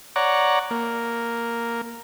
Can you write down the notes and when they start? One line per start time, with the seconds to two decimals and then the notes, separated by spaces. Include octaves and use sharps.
0.16 C#5 D5 F#5 A#5
0.70 A#3